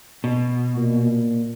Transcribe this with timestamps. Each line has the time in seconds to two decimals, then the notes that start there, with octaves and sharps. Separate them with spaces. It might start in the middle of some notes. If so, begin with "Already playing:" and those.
0.24 B2
0.77 A#2